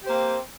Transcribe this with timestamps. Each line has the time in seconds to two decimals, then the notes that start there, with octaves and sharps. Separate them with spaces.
0.04 G4
0.07 C5
0.09 A#3
0.12 C4